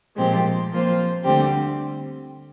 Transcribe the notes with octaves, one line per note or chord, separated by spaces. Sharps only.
A#2 F3 G#3 C4 G4
F3 A#3 F4 C5
D2 D3 G3 C4 G4